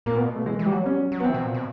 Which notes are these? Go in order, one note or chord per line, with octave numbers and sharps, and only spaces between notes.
A#2 A#3
B3
B2
A3
E3 G#3
E3
G3
F#3
G3 C#4
F#3
F#3
B3
E3 C4
B2
A#2
B2